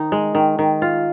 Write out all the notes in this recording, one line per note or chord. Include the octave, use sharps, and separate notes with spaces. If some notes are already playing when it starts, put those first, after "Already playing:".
Already playing: D#3 D#4
G#3
D#3
D#3
F4